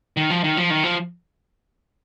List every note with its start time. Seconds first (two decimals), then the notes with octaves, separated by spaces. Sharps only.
0.17 D#3
0.30 F3
0.44 D#3
0.57 F3
0.70 D#3
0.84 F3